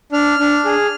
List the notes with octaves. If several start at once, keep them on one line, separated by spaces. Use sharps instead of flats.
D4 F6
D4
G#4